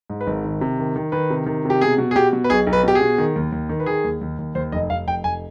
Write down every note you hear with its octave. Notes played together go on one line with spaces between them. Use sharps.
G#2
B4
G#1
D#3
C3
D#3
D#3
D#3 B4
C3
D#3
C3
G4
B2 G#4
B2
G#4
B2 G4
B2
B4
B1 G#4
B1
B4
B2 G4
G#4
B2
D#3
D#2
D#2
D#3
B4
D#3 G#4
D#2
D#2
D#2
D#2 C5
F1 D#5
F1 F5
F1 G5
F1 G#5